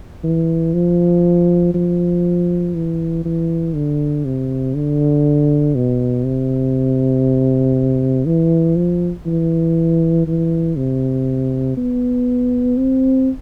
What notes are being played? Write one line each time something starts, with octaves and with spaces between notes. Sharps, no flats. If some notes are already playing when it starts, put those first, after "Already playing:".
E3
F3
F3
E3
E3
D3
C3
D3
B2
C3
E3
F3
E3
E3
C3
B3
C4